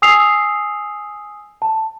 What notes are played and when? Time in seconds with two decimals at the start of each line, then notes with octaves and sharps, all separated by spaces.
0.02 G#5 D#6 E6 C7 F7
1.62 A5